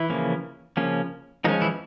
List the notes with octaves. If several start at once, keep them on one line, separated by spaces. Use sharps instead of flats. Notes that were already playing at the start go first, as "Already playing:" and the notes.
Already playing: E3 E4
C#3 F3 A#3 C#4
C#3 F3 A#3 C#4
D#3 F3 G#3 C#4 D#4
E3 E4